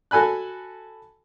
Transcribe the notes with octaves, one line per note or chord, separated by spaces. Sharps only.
F#4 A4 G#5 B5 F#6